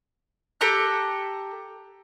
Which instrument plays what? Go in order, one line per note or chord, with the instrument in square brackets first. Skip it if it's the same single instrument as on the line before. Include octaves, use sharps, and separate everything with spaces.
[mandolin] G4 A4 A#5 F#6